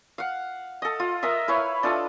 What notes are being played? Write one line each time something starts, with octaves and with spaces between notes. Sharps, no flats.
F5 F#5
A4 D#5
F4
A#4 D#5 E5
E4 B4 C#5 F5
D4 F4 A4 D#5